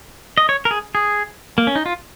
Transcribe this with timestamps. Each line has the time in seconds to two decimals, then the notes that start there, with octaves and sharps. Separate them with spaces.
0.38 D#5
0.49 C#5
0.65 A#4
0.71 G#4
0.95 G#4
1.58 A#3
1.67 C#4
1.75 D#4
1.86 F4